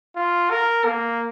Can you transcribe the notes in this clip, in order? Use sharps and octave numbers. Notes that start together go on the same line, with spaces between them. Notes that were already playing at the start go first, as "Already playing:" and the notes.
F4
A#4
A#3